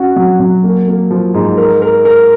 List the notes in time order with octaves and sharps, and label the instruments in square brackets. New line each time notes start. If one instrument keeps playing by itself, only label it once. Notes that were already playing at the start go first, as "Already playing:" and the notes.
Already playing: [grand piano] C#4 F#4
F#3
F#3
A#3
A#3
F3
G#2
A#4
A#4
A#4